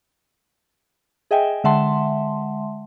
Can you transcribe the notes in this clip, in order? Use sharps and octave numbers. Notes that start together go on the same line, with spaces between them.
G#4 D#5 E5 G5 G#5
D3 G#3 E5 F#5 A5 C6